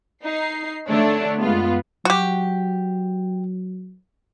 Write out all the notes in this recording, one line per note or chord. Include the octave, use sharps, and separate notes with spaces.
D#4 C7
D3 A3 D4 C#5
F#2 G#3 B3 F4
F#3 F#4 G4